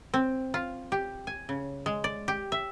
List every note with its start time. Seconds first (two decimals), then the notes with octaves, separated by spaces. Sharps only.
0.14 C4
0.54 F4
0.92 G4
1.27 G#5
1.49 C#3
1.86 G#3
2.04 D5
2.28 G4
2.52 E5